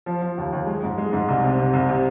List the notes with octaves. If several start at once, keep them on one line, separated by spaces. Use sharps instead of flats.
F3
F3
D#2
D#2
G#3
G#2
G#3
G#2
C2
C3
C3
C2
C3